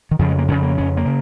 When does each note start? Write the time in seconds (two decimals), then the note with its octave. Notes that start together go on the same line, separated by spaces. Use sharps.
0.11 D#3
0.19 F2 C#3 F3
0.29 G#3
0.38 A#3
0.48 F2 C#3 C#4
0.63 A#3
0.77 F2 C#3 C#4
0.97 A#3
1.06 C#3